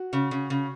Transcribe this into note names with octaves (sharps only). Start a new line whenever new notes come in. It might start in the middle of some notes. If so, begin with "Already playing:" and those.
Already playing: F#4
C#3
C#3
C#3